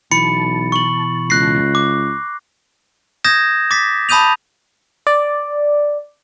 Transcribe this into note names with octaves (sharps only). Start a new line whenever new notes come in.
B1 B2 E3 A5 B5 C#7
C#6 F#7
C#2 F#6 A#6 C7
D6
D#6 G6 G#6 A#6 E7
D6 A6 B6
A5 B5 D#6 G6 D#7 F7
D5